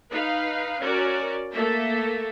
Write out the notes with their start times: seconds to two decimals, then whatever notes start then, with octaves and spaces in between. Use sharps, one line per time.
0.11 D#4 B4 F5
0.81 C#4 F#4 A#4 D5
1.54 A3 A#3 A4 E5